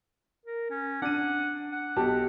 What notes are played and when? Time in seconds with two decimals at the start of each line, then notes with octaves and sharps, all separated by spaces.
0.45 A#4
0.70 C#4
1.02 D4 F#5 D#7
1.72 F#5
1.96 B1 G4 A5